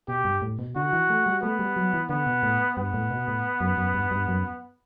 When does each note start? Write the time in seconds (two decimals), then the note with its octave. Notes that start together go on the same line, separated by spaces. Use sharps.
0.08 B2 G4
0.25 G2
0.42 A2
0.59 B2
0.76 D3 F#4
0.93 E3
1.10 A3
1.26 G3
1.42 A3 B3
1.59 G3
1.77 F#3
1.94 E3
2.09 D3 B3
2.26 B2
2.43 A2
2.77 G2 B3
2.94 A2
3.11 B2
3.28 A2
3.61 F#2
3.78 F#2
3.94 G2
4.11 G2
4.28 F#2